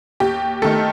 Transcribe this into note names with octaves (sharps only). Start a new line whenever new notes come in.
D#2 G4
D#3 A3 A4